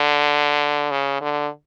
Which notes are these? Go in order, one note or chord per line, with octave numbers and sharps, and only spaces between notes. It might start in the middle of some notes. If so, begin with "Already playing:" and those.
Already playing: D3
C#3
D3